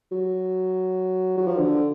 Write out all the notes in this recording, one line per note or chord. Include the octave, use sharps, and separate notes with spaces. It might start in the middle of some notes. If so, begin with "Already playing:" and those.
F#3
F#3
F3
D3